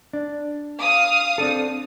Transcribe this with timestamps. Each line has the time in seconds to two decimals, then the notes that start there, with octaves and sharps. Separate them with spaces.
0.13 D4
0.81 F5 D#6
1.38 C4 D4 A4